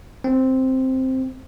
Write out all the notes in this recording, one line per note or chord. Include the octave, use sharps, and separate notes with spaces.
C4